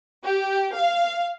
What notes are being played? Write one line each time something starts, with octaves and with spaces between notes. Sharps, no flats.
G4
F5